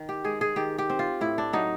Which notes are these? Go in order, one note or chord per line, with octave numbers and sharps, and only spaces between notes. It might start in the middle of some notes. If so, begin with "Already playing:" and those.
Already playing: D#3
G4
G#3 G#4
G#4
D#3 G4
G4
C4
F4
A2 E4
D4
F#3 D#4